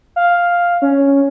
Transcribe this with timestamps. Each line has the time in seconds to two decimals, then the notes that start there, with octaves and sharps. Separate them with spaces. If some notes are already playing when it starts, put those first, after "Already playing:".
0.16 F5
0.82 C#4